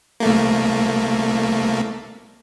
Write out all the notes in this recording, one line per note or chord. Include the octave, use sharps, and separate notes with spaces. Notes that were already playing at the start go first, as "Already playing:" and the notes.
C2 A3 A#3